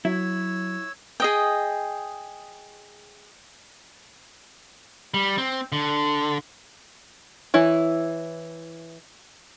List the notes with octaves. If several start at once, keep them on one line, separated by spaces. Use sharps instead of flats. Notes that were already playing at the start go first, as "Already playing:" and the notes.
F#3 E4 C#5 E6
G#4 D#5 G5
G3
C4
D3
E3 E4 C#5